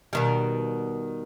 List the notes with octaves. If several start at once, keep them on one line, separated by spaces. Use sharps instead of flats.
B2 D#3 G3